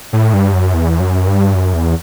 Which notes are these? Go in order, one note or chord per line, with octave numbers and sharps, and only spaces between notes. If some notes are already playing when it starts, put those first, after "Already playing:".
A2
G2
F#2
E2
F#2
G2
F#2
E2